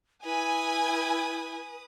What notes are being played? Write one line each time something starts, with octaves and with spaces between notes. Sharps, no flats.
E4 B4 G#5 D#6